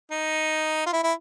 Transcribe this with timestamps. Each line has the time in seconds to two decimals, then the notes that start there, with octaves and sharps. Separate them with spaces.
0.11 D#4
0.86 F4
0.93 E4
1.04 E4